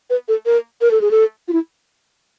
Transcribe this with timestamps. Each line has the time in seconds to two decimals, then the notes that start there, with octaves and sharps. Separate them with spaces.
0.10 B4
0.28 A4
0.46 A#4
0.81 A#4
0.91 A4
1.01 G#4
1.11 A4
1.48 F4
1.53 E4